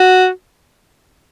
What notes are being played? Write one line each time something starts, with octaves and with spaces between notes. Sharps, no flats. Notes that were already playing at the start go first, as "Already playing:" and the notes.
Already playing: F#4